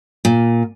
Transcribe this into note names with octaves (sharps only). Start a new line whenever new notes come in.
A#2